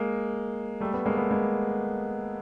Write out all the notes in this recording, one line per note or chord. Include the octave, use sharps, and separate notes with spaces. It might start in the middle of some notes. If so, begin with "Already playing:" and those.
Already playing: G#3 A#3
G3 A3
A3 B3
G#3 A#3
A3 B3
G#3 A#3